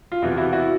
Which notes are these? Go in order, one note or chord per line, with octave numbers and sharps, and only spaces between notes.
F4
E2 C3 E3 E4 F#4
E4 F#4
E4 F#4